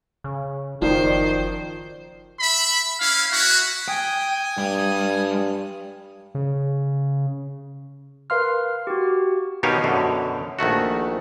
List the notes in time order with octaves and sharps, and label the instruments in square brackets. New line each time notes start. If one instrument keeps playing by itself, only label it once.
[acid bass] C#3
[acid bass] F#1 [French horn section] D#3 D5 [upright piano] F3 [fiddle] C5
[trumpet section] E5 B5
C#4 E4 F5
E4 F#4
[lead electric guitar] G5 [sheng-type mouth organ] G#5 D#6
[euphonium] G2 [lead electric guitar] G3
[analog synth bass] C#3
[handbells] A#4 B4 F5 C6 F6
F#4 G4
[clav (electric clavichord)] B2 D#3 D#4 G4 C#5 F5
F#2 B2 D3
A#1 D#3 A3 F#4